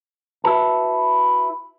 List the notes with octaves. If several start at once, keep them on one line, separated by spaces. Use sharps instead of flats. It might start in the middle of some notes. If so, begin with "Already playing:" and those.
E4 F#4 B4 A5